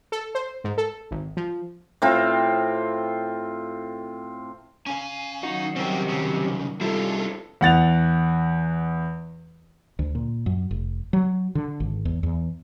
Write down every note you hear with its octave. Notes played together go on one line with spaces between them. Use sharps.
A4
C5
G#2
A4
G#1
F3
A2 C4 F4
C#4 F5 G#5
D#3 F#3 D#4 F#4
C#3 G3 C4 G4
C2 C#3
G#2 C3 F3 G3 E4 F4 A4
E2 F#5 A6 F7
D2
A#2
F#2
F1
F#3
D3
G#1
E2
E2